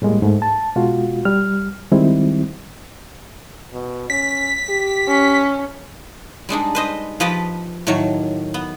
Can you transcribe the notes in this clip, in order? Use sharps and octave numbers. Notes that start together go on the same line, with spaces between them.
A2 G3 G#3 A#3
G#2 A3
A5
B2 G#3 F4 F#4
G3 F6
D#3 G3 G#3 C4 E4
B2
C#4 B6
G4
C#4
G3 G#3 D4 D#4
B4 C5 D#5
F3 G4 B4 D#5 A5 B5
A2 D#3 F#3 C#5
B3